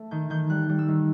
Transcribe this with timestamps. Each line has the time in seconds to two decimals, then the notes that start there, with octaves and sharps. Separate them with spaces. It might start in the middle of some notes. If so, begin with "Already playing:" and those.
Already playing: A3
0.11 D#3 G6
0.30 D#3 G6
0.50 G3 F#6
0.69 G3
0.79 E6
0.88 D#3